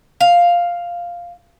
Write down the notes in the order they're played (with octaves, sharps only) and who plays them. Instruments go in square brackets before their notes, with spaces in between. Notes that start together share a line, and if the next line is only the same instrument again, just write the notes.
[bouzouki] F5